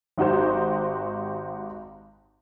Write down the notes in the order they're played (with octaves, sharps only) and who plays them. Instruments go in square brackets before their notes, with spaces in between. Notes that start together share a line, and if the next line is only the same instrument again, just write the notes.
[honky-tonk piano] G#1 D#4 F#4 G4 C5